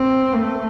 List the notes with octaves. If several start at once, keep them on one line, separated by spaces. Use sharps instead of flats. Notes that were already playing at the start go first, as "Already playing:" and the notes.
Already playing: C4
A3